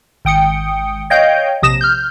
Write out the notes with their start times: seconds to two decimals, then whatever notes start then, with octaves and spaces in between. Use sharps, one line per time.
0.25 G#1 G5 D#6 C#7
1.10 C#5 D#5 F5 G5 G6
1.62 A#1 C3 D#6 A#6 E7
1.81 F6 G6